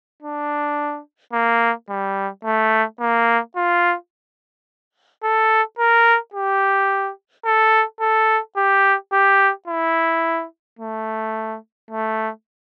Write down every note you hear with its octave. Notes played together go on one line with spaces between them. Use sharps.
D4
A#3
G3
A3
A#3
F4
A4
A#4
G4
A4
A4
G4
G4
E4
A3
A3